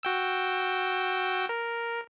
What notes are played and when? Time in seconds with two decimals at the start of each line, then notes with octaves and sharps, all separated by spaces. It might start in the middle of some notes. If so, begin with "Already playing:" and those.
0.03 F#4 G5 E6
1.49 A#4